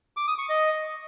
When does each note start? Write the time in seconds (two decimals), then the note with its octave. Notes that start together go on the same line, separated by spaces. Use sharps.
0.17 D6
0.28 D#6
0.38 C#6
0.49 D#5